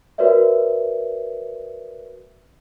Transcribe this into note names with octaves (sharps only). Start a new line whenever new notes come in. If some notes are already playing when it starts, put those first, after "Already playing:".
F#4 A#4 B4 C#5 D5 E5